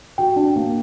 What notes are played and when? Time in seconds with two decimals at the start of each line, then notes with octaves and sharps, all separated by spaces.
0.18 F#4 G5
0.36 D4
0.56 A#3